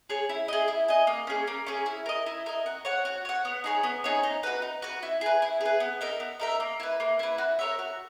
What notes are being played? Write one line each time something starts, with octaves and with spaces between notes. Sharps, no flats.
G#4 C#5
E4
G#4 D#5
E4
G#4 D#5
A#3
C#4 G#4
A#3
C#4 G#4
E4
A#4 D#5
E4
A#4 D#5
F#4
C#5 F#5
F#4
C#5 F#5
B3
D#4 G#4 C#5
B3
D#4 G#4 C#5
D#4
F#4 B4
D#4
F#4 B4
E4
G#4 B4
E4
G#4 B4
B3
D#4 A#4 E5
B3
D#4 A#4 E5
A#3
E4 B4
A#3
E4 B4
F#4
A#4 C#5 E5
F#4